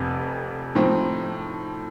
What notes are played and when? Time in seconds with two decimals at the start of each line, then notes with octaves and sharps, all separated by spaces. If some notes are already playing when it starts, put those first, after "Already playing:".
Already playing: F1 F2 C3
0.75 A2 F3 C4 D#4